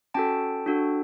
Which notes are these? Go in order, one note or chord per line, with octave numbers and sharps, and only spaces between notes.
C#4 F#4 A4 G5 A5
D4 F#4 A4